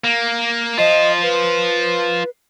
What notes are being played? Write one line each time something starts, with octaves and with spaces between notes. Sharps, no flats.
A#3
F4 C5 D#5
B4